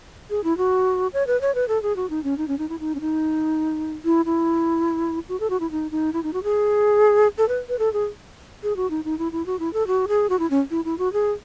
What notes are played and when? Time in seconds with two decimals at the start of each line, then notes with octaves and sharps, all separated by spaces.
0.30 G#4
0.44 E4
0.58 F#4
1.13 C#5
1.27 B4
1.41 C#5
1.55 B4
1.68 A4
1.83 G#4
1.96 F#4
2.10 D#4
2.24 C#4
2.38 D#4
2.48 C#4
2.59 D#4
2.69 E4
2.80 D#4
2.95 C#4
3.01 D#4
4.05 E4
4.25 E4
5.29 F#4
5.40 A4
5.50 F#4
5.60 E4
5.71 D#4
5.91 D#4
6.13 E4
6.23 D#4
6.33 F#4
6.44 G#4
7.38 A4
7.49 B4
7.69 B4
7.79 A4
7.93 G#4
8.63 G#4
8.76 F#4
8.90 D#4
9.05 D#4
9.19 E4
9.32 E4
9.46 F#4
9.59 E4
9.73 A4
9.87 F#4
10.08 G#4
10.30 F#4
10.39 E4
10.50 C#4
10.71 E4
10.85 E4
10.99 F#4
11.13 G#4